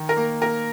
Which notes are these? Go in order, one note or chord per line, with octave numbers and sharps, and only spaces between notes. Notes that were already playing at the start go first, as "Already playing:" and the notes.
Already playing: D#3
A#4
A#3
A#3 A#4